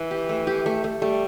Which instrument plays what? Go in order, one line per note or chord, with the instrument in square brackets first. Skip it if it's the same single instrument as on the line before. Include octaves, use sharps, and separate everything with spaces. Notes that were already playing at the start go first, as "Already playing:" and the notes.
Already playing: [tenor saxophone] E3
[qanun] G4
A3
G4
A3
A3
[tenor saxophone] G3 [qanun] A3